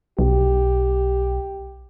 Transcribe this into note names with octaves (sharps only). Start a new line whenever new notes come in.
B1 G4